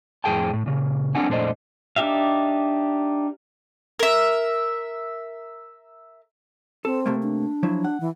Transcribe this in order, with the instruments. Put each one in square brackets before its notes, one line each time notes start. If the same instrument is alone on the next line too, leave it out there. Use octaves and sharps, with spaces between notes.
[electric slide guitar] F2 A2 C3 G#4 G5 A5
A2
A#2 C#3
A3 C4 D4 F#5 G#5
F2 A#2 A3 D4 C5 D#5
[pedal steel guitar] D4 D#4 G4 E5 F5
[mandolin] A#4 E5
[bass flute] C4 [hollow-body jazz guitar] A4
[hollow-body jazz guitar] C3 A3 A#3
[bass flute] D4
[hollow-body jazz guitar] F3 F#3 E4
F#5
[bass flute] E3